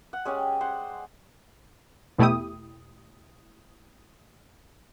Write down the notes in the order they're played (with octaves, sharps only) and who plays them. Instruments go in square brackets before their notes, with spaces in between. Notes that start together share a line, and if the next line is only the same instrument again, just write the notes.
[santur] F#5
G#3 C#4 G4 D5
C5 F#5
[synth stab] E2 B2 A3 E4 G4 D#6